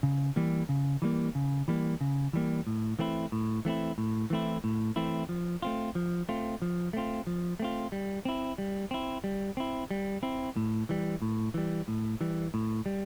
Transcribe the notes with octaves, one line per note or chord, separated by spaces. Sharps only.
C#3
E3 G3 A#3
C#3
E3 G3 A#3
C#3
E3 G3 A#3
C#3
E3 G3 A#3
A2
E3 A3 C4 E4
A2
E3 A3 C4 E4
A2
E3 A3 C4 E4
A2
E3 A3 C4 E4
F3
A3 C4 F4
F3
A3 C4 F4
F3
A3 C4 F4
F3
A3 C4 F4
G3
C4 E4
G3
C4 E4
G3
C4 E4
G3
C4 E4
A2
E3 G3
A2
E3 G3
A2
E3 G3
A2
G3